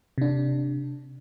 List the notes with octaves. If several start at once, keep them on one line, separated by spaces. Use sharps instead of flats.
C3 D4